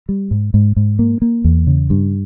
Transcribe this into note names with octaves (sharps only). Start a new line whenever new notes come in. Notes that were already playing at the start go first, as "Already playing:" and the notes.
G3
G#2
G#2
G#2
A#3
A#3
E2
C#3
G2